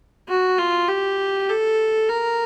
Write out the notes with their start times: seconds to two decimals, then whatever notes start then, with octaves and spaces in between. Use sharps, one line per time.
0.29 F#4
0.58 F4
0.88 G4
1.49 A4
2.09 A#4